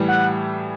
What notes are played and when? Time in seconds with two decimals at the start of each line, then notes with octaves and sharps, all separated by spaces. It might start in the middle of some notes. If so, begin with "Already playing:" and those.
Already playing: A2 E3 G3
0.08 F#5